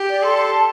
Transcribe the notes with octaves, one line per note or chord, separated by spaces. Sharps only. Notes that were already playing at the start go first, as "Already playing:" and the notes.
Already playing: G4
D5
A4 C6
C6
A5